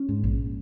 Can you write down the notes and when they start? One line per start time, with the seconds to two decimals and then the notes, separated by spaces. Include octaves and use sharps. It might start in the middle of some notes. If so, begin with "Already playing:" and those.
Already playing: C#4
0.09 G#2
0.24 A#1